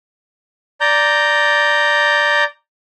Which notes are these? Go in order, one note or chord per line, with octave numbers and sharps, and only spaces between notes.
D5 A#5 G6